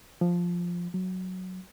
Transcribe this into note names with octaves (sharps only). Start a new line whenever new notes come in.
F3
F#3